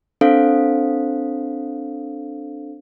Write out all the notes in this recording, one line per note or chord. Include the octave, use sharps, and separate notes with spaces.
C4 D4 A4 C5 F5